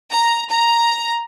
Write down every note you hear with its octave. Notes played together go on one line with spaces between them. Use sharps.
A#5
A#5